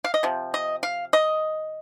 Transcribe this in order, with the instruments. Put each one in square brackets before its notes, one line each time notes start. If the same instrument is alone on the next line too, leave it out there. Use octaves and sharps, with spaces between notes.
[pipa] F5
D#5
C3 F3
D#5
F5
D#5